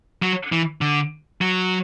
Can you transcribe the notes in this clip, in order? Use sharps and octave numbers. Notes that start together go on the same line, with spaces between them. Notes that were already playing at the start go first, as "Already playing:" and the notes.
F#3
E3
D3
F#3